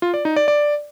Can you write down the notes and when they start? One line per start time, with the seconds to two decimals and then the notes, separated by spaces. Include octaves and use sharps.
0.02 F4
0.14 D5
0.25 D#4
0.36 D5
0.48 D5